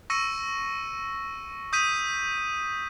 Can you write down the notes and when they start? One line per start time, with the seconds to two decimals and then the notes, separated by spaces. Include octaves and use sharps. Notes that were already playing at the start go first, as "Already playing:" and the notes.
0.10 C#6 E6 A#6 C#7 D#7
1.73 D#6 G6 B6 D#7